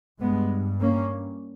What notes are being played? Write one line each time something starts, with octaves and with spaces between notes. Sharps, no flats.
G2 G#3 B3
A#3 C#4